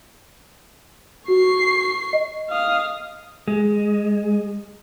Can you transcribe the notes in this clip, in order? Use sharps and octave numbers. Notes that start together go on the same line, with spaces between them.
F#4 C#6 C7
D#5
F5 D#6
G#3